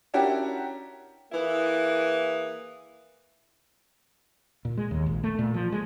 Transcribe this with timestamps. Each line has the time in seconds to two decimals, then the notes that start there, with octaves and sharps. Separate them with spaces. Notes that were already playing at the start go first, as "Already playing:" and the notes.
0.14 C#4 D4 E4 F#4 G4 A#4
1.32 E3 A#3 E4 G#4
4.65 A#2
4.77 G#3
4.91 D#2
5.06 A#1
5.24 A3
5.39 A#2
5.54 F3
5.72 G#3